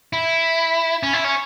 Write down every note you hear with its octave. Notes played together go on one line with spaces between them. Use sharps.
E4
C#4
E4
C#4